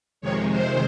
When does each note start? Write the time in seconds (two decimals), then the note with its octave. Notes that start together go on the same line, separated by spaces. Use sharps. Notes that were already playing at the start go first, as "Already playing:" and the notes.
0.21 F2 C3 D#3 G#3 C#5
0.50 C5